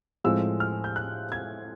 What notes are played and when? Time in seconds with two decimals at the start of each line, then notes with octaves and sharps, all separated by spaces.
0.24 A2 F3 G#3 C4 E6
0.60 F6
0.84 G6
0.96 F#6
1.32 G#6